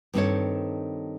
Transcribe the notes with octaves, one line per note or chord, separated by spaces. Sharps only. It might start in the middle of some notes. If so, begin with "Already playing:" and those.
G2 D#3 C4 F#4 A4 C#5